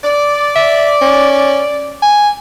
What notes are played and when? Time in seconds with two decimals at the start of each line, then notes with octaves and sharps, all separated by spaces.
0.04 D5
0.56 E5
1.02 C#4
2.02 G#5